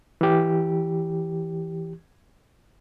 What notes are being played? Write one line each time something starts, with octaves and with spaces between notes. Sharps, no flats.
E3 G4